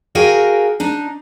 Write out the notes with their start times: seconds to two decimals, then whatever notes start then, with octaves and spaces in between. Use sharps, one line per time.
0.15 F#4 G#4 A#4 F5 G5 G#5
0.80 D4 D#4